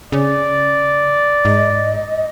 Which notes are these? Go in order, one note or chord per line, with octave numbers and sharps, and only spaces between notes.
C#3 D5
G#2 D#5